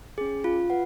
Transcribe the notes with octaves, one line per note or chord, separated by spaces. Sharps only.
C#4 G#4
F4
B4 F#5